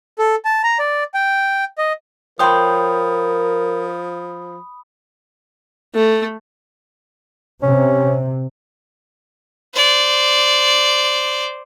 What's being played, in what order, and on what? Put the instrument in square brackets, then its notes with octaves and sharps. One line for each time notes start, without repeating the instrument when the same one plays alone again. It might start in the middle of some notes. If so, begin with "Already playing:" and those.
[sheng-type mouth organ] A4
A5
A#5
D5
G5
D#5
[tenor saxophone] F3 [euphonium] A#4 [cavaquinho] C#5 G5 C6 [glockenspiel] B5 D#6
[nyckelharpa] A3
[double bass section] C3 [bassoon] C#4
[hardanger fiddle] C5 D5